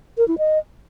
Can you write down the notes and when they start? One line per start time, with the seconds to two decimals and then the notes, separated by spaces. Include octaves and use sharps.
0.18 A#4
0.28 E4
0.38 D#5